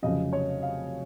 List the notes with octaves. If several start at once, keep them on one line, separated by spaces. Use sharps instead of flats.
F1 F2 C#3 F#3 D#5
C#5
F5